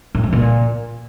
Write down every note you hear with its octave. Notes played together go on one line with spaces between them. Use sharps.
A2
F3
A#2